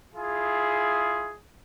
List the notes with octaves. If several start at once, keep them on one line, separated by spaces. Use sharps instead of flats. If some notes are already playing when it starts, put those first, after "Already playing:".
E4 F4 G#4